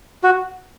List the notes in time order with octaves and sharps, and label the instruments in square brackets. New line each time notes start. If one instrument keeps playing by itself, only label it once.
[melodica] F#4